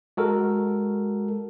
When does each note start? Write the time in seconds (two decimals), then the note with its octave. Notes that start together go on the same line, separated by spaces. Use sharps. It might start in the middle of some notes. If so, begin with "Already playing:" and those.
0.17 G#3 F#4 A4 A#4